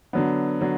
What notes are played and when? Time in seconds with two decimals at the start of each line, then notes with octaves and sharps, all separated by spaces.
0.13 D3 F#3 B3
0.61 D3 F#3